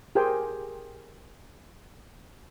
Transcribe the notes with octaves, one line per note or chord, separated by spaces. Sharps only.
G4 G#4 A#4 C5 G5 G#5